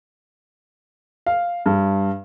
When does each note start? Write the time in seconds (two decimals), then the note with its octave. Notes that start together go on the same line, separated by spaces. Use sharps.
1.26 F5
1.66 G2